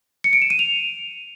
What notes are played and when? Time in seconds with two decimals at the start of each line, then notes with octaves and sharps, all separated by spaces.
0.24 C#7
0.33 D7
0.42 E7
0.50 D#7
0.59 F7